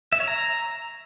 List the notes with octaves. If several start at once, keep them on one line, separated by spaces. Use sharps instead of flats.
E5
C#5
A#5